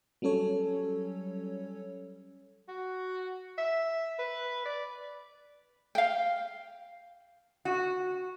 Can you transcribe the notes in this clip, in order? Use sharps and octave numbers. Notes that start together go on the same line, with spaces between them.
F#3 G3 C#4 A4 C#5
F#4
E5
B4
D5
F5 G5
F#4